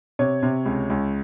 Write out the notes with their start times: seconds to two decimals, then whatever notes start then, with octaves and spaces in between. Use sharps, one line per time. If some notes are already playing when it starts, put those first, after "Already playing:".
0.19 C3 C#5
0.43 C3
0.66 C#2
0.90 C#2